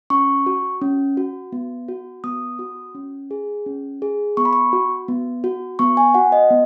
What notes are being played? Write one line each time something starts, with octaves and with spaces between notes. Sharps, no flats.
C#4 C#6
F#4
C#4
F#4
B3
F#4
B3 D#6
F#4
C#4
G#4
C#4
G#4
B3 C#6
B5
C#6
F#4
B3
F#4
B3 C#6
G#5
F#4 F#5
D#5
B3